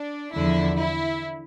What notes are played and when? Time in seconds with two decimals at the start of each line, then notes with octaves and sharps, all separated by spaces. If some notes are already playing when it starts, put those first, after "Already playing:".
Already playing: D4
0.36 E2 D3 F3 E4
0.78 E4